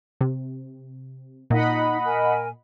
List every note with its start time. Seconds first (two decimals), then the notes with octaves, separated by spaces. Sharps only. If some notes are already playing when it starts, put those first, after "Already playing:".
0.21 C3
1.50 A#2 D#4 D#5 F#5 B5
2.05 A#4 G#5